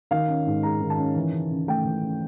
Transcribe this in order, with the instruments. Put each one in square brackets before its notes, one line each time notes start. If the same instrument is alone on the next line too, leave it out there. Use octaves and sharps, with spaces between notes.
[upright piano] D#3 F5
C#4
G#2
G#3 A#5
D#3
A5
C#4
E3
C#3
C#3
A3 G5
E3
C#3